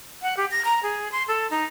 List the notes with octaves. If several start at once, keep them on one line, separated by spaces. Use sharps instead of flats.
F#5
G4
A#6
A#5
G#4
C6
A4
D#4